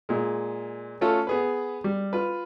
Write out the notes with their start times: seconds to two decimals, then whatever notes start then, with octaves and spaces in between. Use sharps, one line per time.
0.09 A#2 G#3
1.01 A3 C#4 F4 A4
1.27 B3 G#4 B4
1.84 G3
2.13 F4 B4